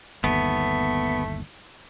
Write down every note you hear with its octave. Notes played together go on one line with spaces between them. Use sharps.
G1 D#2 A3 B3